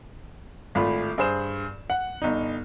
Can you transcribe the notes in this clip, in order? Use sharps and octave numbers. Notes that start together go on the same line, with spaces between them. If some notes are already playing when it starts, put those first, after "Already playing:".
G#1 A2 A3 F4 B5
G2 G#4 C5 E7
F#5
G1 D#4